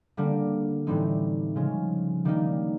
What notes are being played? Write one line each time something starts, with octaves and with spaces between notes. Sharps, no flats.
D3 G3 A#3 D4
A2 E3 G3 C4 D#4
C#3 F3 G#3
D#3 G3 A#3 D#4